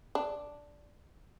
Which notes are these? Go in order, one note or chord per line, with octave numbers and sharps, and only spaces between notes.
D4